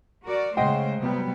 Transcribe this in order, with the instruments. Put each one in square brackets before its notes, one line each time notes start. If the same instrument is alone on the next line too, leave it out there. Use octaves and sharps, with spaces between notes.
[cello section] F#4 A#4 D5
[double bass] C#3 [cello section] G#3 A3 C5 [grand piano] D#5 F#5 G5
[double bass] C3 G3 [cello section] F#3 B3